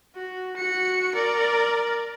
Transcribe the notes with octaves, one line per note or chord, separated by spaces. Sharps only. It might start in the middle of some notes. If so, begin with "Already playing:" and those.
F#4
F#4 C#7
A#4 D5